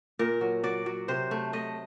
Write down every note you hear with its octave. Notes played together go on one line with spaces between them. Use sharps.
A#2 A#4
F#3
F#3 D5
F#3
C3 C5
A3
A3 D#5